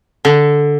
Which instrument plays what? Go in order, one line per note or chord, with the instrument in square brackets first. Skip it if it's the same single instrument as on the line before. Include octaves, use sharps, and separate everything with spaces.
[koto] D3